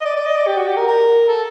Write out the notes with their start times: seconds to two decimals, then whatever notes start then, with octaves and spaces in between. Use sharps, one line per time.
0.01 D#5
0.05 D5
0.16 D5
0.26 D#5
0.37 D5
0.47 G4
0.57 F#4
0.67 G4
0.76 A#4
0.87 A#4
1.28 A4